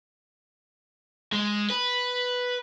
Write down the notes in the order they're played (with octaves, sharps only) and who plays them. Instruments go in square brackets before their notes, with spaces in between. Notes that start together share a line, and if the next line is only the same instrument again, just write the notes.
[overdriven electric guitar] G#3
B4